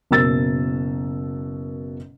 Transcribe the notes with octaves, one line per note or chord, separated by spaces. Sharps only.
F#1 B2 A#4 E6 A6